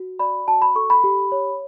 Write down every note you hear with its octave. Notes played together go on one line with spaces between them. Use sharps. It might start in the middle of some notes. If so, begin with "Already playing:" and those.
Already playing: F#4
D5 B5
F#4 A5
B5
A4 C#6
B5
G4
C#5